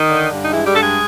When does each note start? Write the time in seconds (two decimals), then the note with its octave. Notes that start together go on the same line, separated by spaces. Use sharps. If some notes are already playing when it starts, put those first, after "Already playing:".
Already playing: D#3 D#4
0.10 D3
0.32 G2
0.44 D#4
0.52 E3 G#3 E4
0.67 G3 G4
0.73 G2 A4
0.81 G#3 G#4